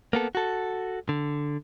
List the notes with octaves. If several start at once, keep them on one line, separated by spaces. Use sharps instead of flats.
A#3 B3 A4
F#4 A4
D3